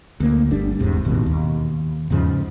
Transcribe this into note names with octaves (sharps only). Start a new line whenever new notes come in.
D2 A#3
G1 G3 D4
E1 E2 G#2 C3
A1 B2 D#3
D#2
E2 G#2 C#3 F3